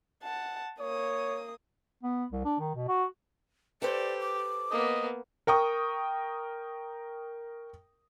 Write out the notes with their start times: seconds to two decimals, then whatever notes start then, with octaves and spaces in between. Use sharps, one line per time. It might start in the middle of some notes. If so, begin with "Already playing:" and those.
0.23 F#5 A5
0.80 A#3 C#5 D#6
2.03 B3
2.32 C2
2.45 D4
2.60 D#3
2.75 B2
2.88 F#4
3.82 G4 A4 B4 C5 D5
4.20 D6
4.71 A#3 B3 D#5
5.47 A#4 G5 C#6 D#6